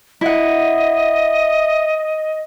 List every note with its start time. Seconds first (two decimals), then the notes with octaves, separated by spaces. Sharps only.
0.21 E4 D#5 F#5